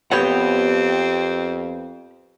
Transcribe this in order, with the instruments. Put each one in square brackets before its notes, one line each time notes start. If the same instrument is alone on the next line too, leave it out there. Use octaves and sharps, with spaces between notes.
[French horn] F2 [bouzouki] B3 G5 [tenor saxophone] C4 [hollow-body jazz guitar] G4 C#5 F#5